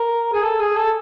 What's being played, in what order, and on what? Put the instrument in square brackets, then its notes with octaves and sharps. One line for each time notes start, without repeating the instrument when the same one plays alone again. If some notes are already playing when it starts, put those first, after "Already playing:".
Already playing: [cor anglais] A#4
G#4
A4
G#4
A4